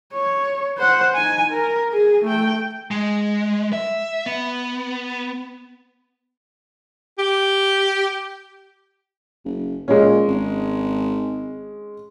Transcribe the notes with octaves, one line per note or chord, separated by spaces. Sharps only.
C#5
C5 F#5
D#4 G#5
A#4
G#4
A3 G5
G#3
E5
B3
G4
F#1
A#2 G#3 C#4
G#1